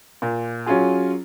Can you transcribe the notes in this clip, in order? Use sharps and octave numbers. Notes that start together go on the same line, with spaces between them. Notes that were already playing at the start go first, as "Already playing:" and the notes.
A#2
F#3 C#4 F4 G#4